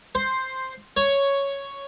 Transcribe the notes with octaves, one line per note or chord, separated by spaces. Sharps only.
C5
C#5